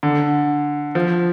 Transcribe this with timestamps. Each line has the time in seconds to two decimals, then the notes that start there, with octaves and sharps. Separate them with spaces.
0.03 D3
0.95 F3